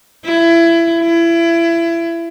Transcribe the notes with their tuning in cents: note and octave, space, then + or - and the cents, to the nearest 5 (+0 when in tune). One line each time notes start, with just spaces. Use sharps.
E4 +25
E4 +25